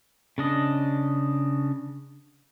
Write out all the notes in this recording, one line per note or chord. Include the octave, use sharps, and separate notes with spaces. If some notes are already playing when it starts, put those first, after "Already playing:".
C#3 D4 D#5